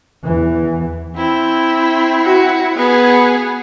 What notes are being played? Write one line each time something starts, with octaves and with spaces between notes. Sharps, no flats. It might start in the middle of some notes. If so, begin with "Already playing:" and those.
E2 E3
C4 E4
F#4
B3 G#4